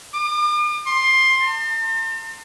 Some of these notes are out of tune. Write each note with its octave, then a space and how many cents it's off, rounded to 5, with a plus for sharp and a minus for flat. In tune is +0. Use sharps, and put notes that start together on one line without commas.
D6 +45
C6 +15
A5 +45